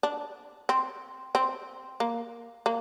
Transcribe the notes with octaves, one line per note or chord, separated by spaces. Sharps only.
D4
C4
C4
A#3
A#3